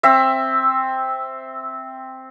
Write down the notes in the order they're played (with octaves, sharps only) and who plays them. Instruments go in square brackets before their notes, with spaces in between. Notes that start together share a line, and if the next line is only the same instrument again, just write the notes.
[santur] C4 E5